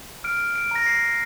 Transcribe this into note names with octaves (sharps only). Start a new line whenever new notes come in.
F6 D7
D7
A#5 A#6
C7